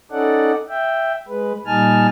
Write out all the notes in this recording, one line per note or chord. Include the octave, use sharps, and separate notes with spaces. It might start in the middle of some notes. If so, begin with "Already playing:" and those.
C#4 D#4 A4 D5 F#5
E5 G5
G#3 B4
A#2 G3 D#4 G#5 A5 F6